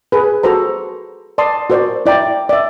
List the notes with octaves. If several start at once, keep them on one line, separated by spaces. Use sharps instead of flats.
G#4 B4
F#4 A4 B4 C5 A#5
D5 A5 C6 D#6
F#4 A#4 C5 D5
E4 D5 G5 A#5
D5 E5